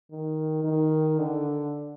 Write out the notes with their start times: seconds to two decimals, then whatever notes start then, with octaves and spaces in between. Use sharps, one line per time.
0.11 D#3
0.64 D#3
1.19 D3